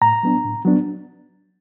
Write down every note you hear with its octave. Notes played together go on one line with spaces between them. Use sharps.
A2 A#5
F#3 B3 D4
A2
F#3 B3 D4